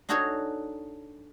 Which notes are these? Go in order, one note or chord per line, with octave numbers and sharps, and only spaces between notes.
D4 D#4 F#4 G#4 A4 C#5